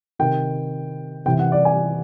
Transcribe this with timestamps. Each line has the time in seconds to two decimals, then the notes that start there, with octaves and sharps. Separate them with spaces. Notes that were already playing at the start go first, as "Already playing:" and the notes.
0.19 C3 D#3 G5
1.26 C3 E3 G5
1.39 F#5
1.52 D5
1.65 G#5